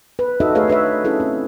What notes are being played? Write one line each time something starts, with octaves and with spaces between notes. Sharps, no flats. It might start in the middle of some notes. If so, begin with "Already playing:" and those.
B4
D#4 F#4 A4 D#5 E5
A3 G#4 B4 C#5 F5
D4 B4 C#5 E5
C#4 E4 G#4 A4
C4 E4